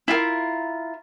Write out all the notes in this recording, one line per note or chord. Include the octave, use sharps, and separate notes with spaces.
E4 F4 G4 A#4